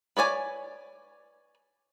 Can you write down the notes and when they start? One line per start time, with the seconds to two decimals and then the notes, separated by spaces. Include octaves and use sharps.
0.17 B4 C#5 D5 G#5